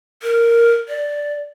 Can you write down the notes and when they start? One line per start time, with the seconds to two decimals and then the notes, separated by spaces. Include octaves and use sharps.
0.23 A#4
0.89 D5